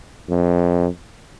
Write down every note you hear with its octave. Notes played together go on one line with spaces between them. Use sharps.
F2